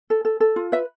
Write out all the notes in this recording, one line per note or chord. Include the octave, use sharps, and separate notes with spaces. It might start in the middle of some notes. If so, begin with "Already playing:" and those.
A4
A4
A4
F4
B4 E5